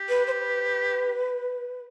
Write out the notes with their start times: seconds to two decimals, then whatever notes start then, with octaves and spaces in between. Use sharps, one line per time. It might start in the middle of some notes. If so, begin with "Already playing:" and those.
Already playing: G4
0.09 B4
0.27 C5
0.31 B4